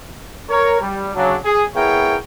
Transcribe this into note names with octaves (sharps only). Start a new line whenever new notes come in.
A#4 C#5
G3
C#3 F#3 D4
G#4
B3 E4 G#4 A#4 C#5 G5